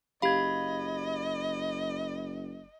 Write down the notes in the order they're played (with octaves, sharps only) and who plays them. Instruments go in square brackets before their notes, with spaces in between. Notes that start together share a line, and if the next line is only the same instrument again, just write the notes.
[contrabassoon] F#1 [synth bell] G4 F5 [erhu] D#5 [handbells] B5 G#6